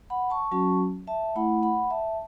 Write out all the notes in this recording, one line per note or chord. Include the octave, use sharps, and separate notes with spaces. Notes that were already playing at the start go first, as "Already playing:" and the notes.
F#5 B5
A5 C#6
F#3 C#4 F#4 A5 C#6
E5 A5
A3 E4 F#5 B5
F#5 B5
E5 A5